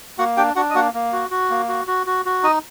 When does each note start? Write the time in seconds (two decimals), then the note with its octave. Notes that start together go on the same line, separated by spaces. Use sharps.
0.19 A#3 F#4 F#5
0.37 D4 G4 G5
0.56 D4 F#4 F#5
0.70 D#5
0.75 A#3 F#4 F#5
0.94 A#3
1.13 F#4
1.31 F#4
1.50 A#3
1.68 F#4
1.87 F#4
2.07 F#4
2.26 F#4
2.43 D#4 D#5